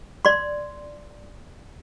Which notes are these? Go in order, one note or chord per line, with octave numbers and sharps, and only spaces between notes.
D5 C6